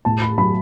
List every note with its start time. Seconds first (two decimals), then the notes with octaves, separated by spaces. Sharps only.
0.05 A2 A5
0.22 B5
0.38 F#3 B5